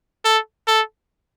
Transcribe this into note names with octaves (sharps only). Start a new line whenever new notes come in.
A4
A4